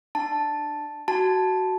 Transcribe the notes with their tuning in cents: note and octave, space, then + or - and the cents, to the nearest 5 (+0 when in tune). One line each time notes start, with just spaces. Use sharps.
D4 +25 A5 +0
F#4 +15 A5 -5